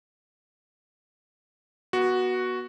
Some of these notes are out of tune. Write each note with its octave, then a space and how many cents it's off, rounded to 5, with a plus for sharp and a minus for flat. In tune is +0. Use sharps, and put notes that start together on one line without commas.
B3 -30 F#4 +0